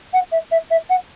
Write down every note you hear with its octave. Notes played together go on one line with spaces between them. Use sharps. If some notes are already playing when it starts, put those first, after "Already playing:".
F#5
E5
E5
E5
F#5